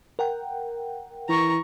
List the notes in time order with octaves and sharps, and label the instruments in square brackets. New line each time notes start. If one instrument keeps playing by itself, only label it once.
[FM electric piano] A#4 F#5 G5
[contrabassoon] E3 [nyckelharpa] A#5 C#6